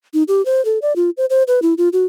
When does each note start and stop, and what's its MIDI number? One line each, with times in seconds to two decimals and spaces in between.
0.14 0.23 63
0.28 0.44 67
0.45 0.64 72
0.65 0.79 69
0.82 0.95 74
0.96 1.10 65
1.17 1.26 72
1.30 1.43 72
1.48 1.60 71
1.62 1.74 64
1.78 1.89 65
1.93 2.06 66